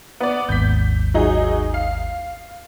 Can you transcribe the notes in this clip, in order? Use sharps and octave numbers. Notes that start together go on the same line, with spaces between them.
B3 D5
G#1 D#2 G#2 G6 B6
F#3 D#4 G#4
F5